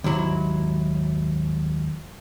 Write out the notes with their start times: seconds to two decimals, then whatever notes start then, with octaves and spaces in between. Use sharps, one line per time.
0.04 D#2 G#2 F#3 E4